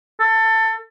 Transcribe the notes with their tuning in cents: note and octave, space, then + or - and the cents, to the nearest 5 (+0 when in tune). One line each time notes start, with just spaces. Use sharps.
A4 +20